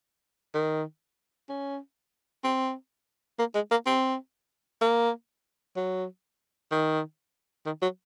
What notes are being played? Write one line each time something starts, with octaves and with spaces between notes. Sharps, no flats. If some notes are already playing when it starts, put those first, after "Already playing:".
D#3
C#4
C4
A#3
G#3
A#3
C4
A#3
F#3
D#3
D#3
F#3